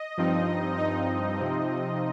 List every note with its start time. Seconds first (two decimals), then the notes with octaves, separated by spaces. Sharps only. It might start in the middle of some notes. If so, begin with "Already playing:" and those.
Already playing: D#5
0.17 G2 F3 C4 D#4
0.77 D#4 D#5
1.37 C3 F3 C4 D#4